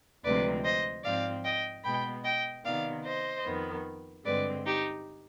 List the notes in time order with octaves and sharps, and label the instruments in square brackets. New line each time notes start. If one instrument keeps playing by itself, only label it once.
[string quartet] D2 C3 F3 G#3 C4 B4 D5
C5 D#5
G#2 F3 C4 D5 F5
D#5 G5
B2 G#3 B3 G5 B5
D#5 G5
C3 D#3 B3 D5 F5
C5 D#5
F2 D#3 B3
G2 D3 G#3 C4 B4 D5
D#4 G4